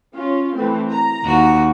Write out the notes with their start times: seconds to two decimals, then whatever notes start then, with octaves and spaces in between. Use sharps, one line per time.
0.15 C#4 F4
0.54 E3 A3 C4
0.90 A#5
1.25 D#2 F#4